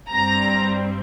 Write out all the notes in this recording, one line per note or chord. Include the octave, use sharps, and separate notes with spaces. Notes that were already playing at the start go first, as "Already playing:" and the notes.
G2 G3 C4 A#5